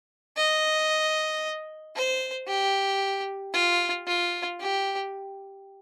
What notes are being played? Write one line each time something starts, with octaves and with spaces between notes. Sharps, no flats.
D#5
C5
G4
F4
F4
G4